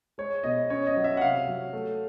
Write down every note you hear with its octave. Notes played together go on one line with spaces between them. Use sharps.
G#3 C#5
B2 D#5
C#4 C#5
D#5
F#3
E5
F#5
C3 F5
F#3
A3